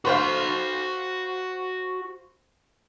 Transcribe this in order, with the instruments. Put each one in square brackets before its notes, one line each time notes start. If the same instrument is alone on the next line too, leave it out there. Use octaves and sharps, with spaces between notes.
[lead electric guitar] F#4 C6 [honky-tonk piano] B4 C5 F5